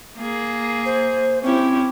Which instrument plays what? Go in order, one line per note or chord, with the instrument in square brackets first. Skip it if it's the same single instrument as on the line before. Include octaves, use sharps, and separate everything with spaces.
[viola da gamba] A#3 G#4
[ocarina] C5
[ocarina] C4 [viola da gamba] C#4 E4 G4